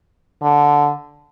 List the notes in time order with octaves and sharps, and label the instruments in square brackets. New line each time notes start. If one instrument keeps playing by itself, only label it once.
[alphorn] D3